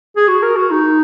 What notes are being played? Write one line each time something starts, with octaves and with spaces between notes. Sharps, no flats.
G#4
F#4
A#4
F#4
D#4